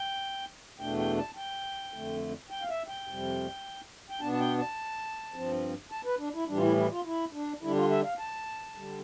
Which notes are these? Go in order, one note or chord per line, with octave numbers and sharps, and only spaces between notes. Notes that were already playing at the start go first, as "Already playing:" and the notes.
Already playing: G5
E2 B2 A3 D4 G5
G5
A5
G5
F2 D3 A3
G5
F5
E5
G5
F2 C3 G3
G5
B2 B3 D4 A5
A5
G5
A5
G2 F3 C4
A5
B4
D4
E4
A2 E3 G3 D4
F4
E4
E4
F4
E4
D4
D3 G3 D4 E4
F4
E5
F5
A5
D3 G3